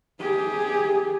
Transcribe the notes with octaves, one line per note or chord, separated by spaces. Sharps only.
G4 G#4